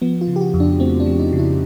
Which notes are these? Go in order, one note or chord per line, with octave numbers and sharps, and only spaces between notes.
F3 B3
F4
C#3
G4
F#4
F2
D4
A3 C4
D4
F3
D#4
C#3
E4